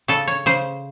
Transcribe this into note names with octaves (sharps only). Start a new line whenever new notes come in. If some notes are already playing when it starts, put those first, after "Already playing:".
C#3 A4
C#5
C#3 C5